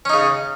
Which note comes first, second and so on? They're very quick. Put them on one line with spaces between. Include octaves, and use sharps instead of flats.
C#4 D#4 C#3